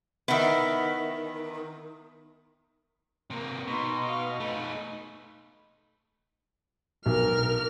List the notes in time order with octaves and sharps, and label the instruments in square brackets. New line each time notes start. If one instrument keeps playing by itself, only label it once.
[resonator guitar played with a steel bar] D#3 B3 [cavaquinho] E4 E5
[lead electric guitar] C3 A#3
[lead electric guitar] B2 [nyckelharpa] D#4 C6
[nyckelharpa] D#5 F5
[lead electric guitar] A3 D#4 [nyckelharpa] B5
[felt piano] B1 [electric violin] A#4 F6